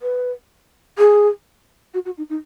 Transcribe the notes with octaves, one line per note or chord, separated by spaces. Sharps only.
B4
G#4
F#4
F#4
D#4
D#4